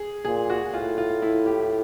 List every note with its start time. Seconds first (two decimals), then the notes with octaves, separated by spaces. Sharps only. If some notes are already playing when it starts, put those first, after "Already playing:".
Already playing: G#4
0.25 A#2 G#4
0.50 F#4
0.74 A2 F4
0.98 F4
1.22 E4
1.46 G4